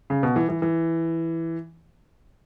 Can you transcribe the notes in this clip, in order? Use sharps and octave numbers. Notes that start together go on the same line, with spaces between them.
C#3
B2
E3
E3
E3